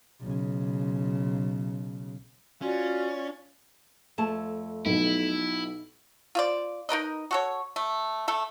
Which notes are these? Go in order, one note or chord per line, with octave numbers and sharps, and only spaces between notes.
B1 C#3
C#4 F4 F#4 D5
F2 A3 A5
B1 B2 E4
F4 C5 D5
D#4 A#4 B4 D#5
F#4 A4 C#5
A3
A3 A4